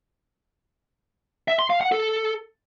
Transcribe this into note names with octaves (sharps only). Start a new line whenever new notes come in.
E5
C6
F5
F#5
A4